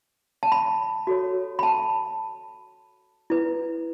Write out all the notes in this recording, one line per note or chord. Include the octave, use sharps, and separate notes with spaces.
A5
B5
F#4 A4 C#5
B5
A5
E4 B4